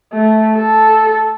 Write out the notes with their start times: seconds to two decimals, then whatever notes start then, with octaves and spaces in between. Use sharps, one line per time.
0.13 A3
0.56 A4